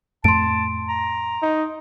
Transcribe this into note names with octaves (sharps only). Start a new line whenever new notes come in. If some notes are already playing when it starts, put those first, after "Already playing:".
F2 A2 A3 A5 C6 D7
A#5
D#4